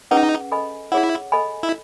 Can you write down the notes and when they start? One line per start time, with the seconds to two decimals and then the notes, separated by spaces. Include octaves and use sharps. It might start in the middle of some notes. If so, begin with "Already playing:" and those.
0.11 C#4 D#4 G#4 B4 F#5
0.52 A4 D#5 G#5 B5
0.92 E4 G#4 C#5 F#5
1.32 A4 D#5 G#5 B5
1.63 E4